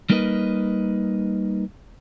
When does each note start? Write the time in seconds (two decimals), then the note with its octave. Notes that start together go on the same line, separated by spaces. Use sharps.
0.10 G3 A#3 D#4 A#4 B4 D#5